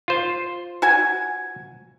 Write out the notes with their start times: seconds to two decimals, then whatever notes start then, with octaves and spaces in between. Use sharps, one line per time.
0.08 F4 C5
0.82 F#4 G#5